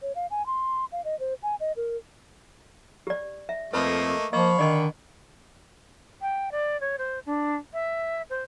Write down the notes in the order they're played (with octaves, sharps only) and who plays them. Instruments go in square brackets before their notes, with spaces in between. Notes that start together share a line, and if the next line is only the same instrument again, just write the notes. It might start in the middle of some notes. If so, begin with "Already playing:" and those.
[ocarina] C#5
F5
G#5
C6
F5
D#5
C5
G#5
D#5
A#4
[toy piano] G4 D5
E5
[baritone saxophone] F2 [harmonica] A3 A#3 D#5 [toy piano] B4 B5
[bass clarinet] F3 [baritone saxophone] A#3 [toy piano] D#5 [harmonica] F5 B5 C#6
[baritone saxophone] D3 [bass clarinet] D#3 [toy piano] D5 D#5 C6
[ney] G5
D5
C#5
C5
D4
E5
C5